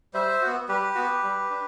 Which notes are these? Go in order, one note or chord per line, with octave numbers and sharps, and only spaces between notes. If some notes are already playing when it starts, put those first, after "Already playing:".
G3 C5 E5
B3 F#4
G3 G4 B4
B3 F#4
G3
D4